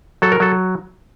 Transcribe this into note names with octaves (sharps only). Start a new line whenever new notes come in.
F#3 A4
A#4
F#3 A4